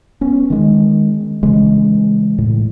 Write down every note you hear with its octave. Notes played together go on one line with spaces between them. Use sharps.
B3 C#4
D#3 G#3
C#3 E3 G#3
A2